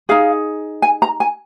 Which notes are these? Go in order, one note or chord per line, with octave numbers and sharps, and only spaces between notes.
D#4 G#4 F5
G#5
A#5
G#5